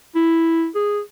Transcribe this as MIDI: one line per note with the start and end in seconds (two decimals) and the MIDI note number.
0.15 0.68 64
0.75 1.00 68